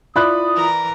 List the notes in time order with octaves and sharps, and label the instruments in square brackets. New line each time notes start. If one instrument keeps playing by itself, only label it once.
[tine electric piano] E4 F4 [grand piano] D5 B5 F#6 [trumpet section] D#6
[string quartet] E3 A#4 A#5